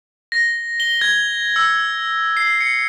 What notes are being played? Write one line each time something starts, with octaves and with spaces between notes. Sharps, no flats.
A#6
G7
G#6
E6
C7
C#7